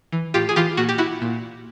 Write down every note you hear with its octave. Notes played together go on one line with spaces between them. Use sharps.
E3
A2 F4 G4
G#4
E3 F4 G4
A#2 F#4
G4
E4 F#4
A#2